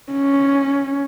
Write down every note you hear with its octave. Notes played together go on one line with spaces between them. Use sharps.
C#4